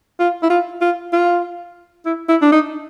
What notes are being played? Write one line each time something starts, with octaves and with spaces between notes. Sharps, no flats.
F4
E4
F4
F4
F4
E4
E4
D4
D#4